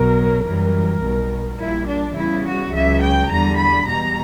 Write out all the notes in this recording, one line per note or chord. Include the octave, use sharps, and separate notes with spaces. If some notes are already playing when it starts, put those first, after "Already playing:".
Already playing: B1 B2 F#3 A#4
F#2 E3 G3 A#4
B1 B2 G3
A#1 A#2 G3 E4
D4
E2 C#3 E3 G3 E4
F#4
C#2 C#3 F#3 E5
G5
E2 D3 G3 A#5
B5
E2 B2 G3 A#5